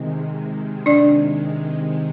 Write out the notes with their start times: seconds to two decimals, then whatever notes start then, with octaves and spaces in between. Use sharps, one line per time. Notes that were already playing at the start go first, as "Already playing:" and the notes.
Already playing: C3 D#3 G#3
0.86 D4 D5